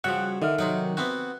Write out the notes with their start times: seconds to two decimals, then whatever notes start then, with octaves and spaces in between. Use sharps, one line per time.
0.04 C#3 F3 G3 F#4 E5 F#5
0.42 D3 D#3 A4 E5 F6
0.58 C3 F#3 D#4 F#5
0.97 B3 C4 F#4 E5 F#6